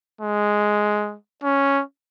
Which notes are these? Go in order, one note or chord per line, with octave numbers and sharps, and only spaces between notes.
G#3
C#4